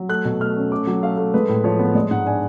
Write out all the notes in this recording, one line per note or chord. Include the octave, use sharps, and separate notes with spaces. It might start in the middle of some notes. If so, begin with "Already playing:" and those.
Already playing: F#3
A3 F#6
B2
A3 F6
C#4
A3 D6
F#3
A3 F5
A3
G#3 B4
A2
F3 C#5
B3
G#3 D5
G#2 F#5
D4 G#5